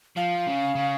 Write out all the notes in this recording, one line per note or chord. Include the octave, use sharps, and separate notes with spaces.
F3 F5
C#3
C#3